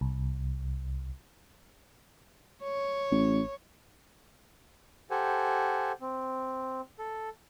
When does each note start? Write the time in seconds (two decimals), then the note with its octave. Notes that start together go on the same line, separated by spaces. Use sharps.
0.01 C2
2.63 C#5
3.11 A1
5.11 G4 A4 C5 F#5 G#5
6.01 C4
6.99 A4